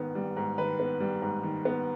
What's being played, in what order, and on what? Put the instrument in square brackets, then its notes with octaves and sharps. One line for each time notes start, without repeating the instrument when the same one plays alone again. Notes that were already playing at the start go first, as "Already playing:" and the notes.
Already playing: [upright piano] G#2 D#3 B3
G3
G#2
D#3 B4
B3
G3
G#2
D#3
B3